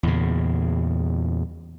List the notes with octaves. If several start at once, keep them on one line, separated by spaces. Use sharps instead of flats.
E2 A#2 C#3